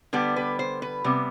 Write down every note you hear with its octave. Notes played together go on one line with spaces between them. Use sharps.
D3 G3 B3 G4
B4
C5
B4
C3 G3 B3